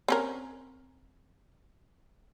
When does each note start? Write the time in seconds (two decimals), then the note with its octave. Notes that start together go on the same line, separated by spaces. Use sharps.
0.08 C4 C#4 A#4